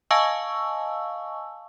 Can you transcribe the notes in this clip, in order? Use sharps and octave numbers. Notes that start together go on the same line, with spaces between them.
D#5 F5 G#5 A5 C#6 E6